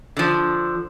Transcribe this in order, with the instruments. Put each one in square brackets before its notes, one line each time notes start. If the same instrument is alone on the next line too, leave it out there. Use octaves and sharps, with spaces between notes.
[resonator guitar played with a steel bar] D3 F3